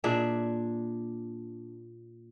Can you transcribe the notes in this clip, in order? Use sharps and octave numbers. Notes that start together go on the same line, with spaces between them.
A#2 D4 G#4 E5